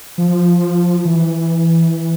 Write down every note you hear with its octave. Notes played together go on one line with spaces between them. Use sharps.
F3
E3